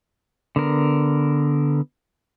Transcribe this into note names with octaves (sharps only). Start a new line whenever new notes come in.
D3 B3 A#4